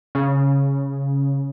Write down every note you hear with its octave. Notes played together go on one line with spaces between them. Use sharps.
C#3